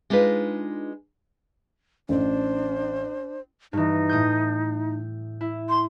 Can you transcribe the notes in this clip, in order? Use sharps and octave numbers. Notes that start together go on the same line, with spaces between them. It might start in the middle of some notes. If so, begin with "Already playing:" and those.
G#3 D4 D#4 F4 B4
A1 D4 C5
G2 E3 D#4
A2 D#6 G6
E4
C6